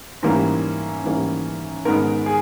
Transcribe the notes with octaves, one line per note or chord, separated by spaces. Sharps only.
G#2 E3 G3 A#3 C#4
G#2 E3 G3 A#3 C#4
G#2 D#3 G#3 B3 A#4
G#4